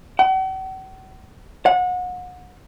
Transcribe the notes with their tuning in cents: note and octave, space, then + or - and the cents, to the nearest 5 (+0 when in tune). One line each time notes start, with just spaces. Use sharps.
F#5 +45
F#5 -30